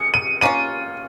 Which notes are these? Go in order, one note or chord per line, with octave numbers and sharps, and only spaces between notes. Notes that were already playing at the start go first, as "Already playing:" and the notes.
Already playing: G#4 C#7
D#7
A#3 C#4 F4 D#7